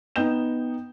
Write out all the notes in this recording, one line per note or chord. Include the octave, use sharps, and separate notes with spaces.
B3 D#4 G5 G6 E7